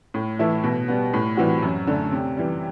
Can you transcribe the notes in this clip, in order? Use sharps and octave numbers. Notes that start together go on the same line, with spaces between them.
A2
E3 A3 E4
B2
G3 B3
A2
E3 G3 C4 F#4
F#2
D3 A3
C3
E3 G3